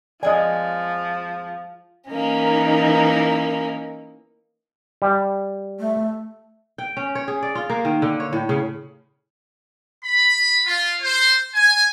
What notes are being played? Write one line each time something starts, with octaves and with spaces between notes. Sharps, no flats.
F2 F3 G#3 D5 D#5 G#5
E3 A#3 C#4 D#4 A#4
G3
A3
G5
C#4
C#5
G#4
D5
F4
A#3
D#3
D3
C#5
A2
C#3
B5
F4
C5
G#5